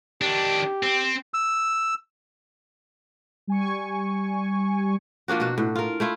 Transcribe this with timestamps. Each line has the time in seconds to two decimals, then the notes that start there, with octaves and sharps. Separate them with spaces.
0.22 D#3 D4 G4
0.83 C4
1.34 E6
3.47 G3 G#5 C#6
5.28 F3 A#3 D4 F#4
5.40 B2 F#4
5.58 A2
5.75 F4 A#4
6.00 A3 E4 F4